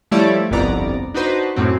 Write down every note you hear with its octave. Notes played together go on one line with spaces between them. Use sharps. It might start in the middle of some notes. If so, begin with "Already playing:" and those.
F3 G3 A3 E4 C#5 D5
G1 C2 F2 B3 D5 A#5
D4 D#4 F#4 B4 C5
F#2 A2 F#3 C4